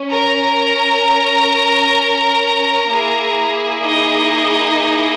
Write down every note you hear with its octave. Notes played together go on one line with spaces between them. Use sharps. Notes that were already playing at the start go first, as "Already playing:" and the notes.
Already playing: C#4
A#4 A#5
A#3 E4 G#4
D#4 D#5